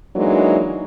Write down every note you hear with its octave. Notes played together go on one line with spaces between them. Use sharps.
E3 F#3 G#3 A#3 D4 D#4